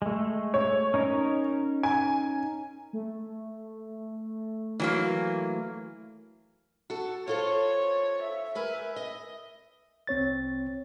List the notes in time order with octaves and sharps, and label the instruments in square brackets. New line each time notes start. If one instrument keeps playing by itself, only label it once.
[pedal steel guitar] G#3 A3
[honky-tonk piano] C#5
[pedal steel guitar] C#4 D#4 A#4
[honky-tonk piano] G#5
[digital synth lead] A3
[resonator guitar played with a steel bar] E3 F#3 A#3
[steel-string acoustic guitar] F#4 A4
[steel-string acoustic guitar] F4 A4 C5 [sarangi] C#5
[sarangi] E5
[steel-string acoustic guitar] A#4 B4 G#5
D#5
[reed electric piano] C2 C4 C#5 A6